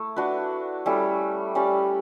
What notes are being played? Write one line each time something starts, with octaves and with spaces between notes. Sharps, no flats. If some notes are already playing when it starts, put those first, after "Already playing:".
Already playing: A3 E4
D4 F#4 B4
G3 C#4 E4 A4
G3 C#4 G4 D5